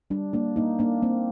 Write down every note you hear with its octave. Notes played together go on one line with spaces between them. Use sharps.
G3 D4
A#3 D4
A#3 D#4
A#3 D4
A#3 C4